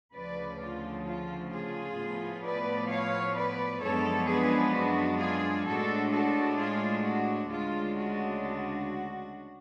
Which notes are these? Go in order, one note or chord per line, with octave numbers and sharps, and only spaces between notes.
D2 C#3 F3 B4 D5
F4
F4
F4 G#4
A2 F3 B3
B4 D5
C#5 F5
B4 D5
F#2 F3 G#3 B3 D4 A4 C#5
G#4 B4
F#4
F4 G#4
A2 G#3 D4 F#4 A4
F#4 A4
F4 G#4
F#4
D2 C#3 G#3 D4 F4
F#4
F#4